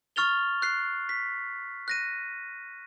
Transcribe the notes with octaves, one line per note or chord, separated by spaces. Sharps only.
C#6 F6 A6 F7 G7
F#6 C7
B6
F#6 A#6 D#7